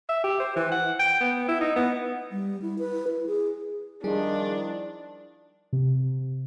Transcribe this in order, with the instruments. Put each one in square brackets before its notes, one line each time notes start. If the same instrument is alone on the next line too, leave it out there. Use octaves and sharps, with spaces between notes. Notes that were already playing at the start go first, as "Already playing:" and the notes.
[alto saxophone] E5
G4
C5
E3
F#5
G5
B3
E4
D#4
B3
[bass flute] G3
E4
B4
E4
G#4
[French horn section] D#3 F3 E4 [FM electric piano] G3 G#4 [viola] D4
[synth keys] C3